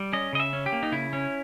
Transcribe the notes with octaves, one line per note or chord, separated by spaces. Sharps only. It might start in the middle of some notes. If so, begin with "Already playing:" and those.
Already playing: G3
C#4 D#5
C#3 D#5
E5
C#4
G4
A#3
D#4
C#3 E4
C#4